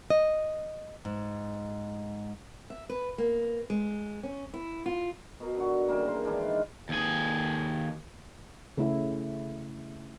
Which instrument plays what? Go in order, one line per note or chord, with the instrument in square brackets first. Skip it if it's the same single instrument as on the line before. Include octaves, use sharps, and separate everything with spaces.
[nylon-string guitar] D#5
G#2
[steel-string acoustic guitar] E5
B4
A#3
G#3
C#4
E4
F4
[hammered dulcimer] B2 A#4
D3 F#4
C#3 E3 G3 A#3
A#4 C5
D#3 E3 G#3 D4
B4 F5
[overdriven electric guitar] D#2 G#4
[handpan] C#3 A3 E4